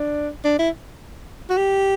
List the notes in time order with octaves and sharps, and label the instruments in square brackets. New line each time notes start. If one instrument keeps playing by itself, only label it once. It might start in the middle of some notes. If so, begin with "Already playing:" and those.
Already playing: [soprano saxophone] D4
D4
E4
F#4
G4